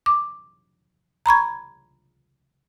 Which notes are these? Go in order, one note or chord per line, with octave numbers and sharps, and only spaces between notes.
D6
A#5 B5 C#6 G#6